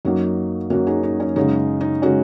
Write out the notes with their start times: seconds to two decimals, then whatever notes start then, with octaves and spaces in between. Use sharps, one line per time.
0.05 F#2 F#3 A#3 D#4
0.70 F#2 F#3 A#3 C#4 F#4
0.87 D#4 G#4
1.03 D#4
1.20 C#4
1.36 F#2 C#3 G#3 D#4
1.81 D#4
2.02 C#3 G#3 C#4 F#4